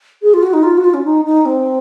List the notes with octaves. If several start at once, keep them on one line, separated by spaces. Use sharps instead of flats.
G#4
F4
F#4
D#4
F4
F#4
F4
C#4
D#4
D#4
C4